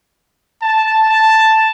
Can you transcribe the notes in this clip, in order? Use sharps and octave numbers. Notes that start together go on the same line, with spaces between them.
A5
A5